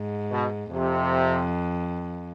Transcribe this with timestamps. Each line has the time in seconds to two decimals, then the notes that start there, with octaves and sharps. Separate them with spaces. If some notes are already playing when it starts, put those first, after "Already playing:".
Already playing: G#2
0.31 B2
0.72 F2 C3